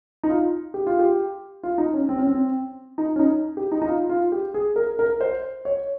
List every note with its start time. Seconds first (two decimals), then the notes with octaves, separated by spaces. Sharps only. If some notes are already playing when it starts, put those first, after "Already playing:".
0.23 D#4
0.29 F4
0.74 G4
0.87 F4
0.99 G4
1.63 F4
1.78 D#4
1.94 C#4
2.09 C4
2.18 C#4
2.27 C4
2.98 D#4
3.16 C#4
3.19 D#4
3.57 G4
3.72 D#4
3.82 D#4
3.87 F4
4.09 F4
4.32 G4
4.54 G#4
4.76 A#4
4.99 A#4
5.21 C5
5.65 C#5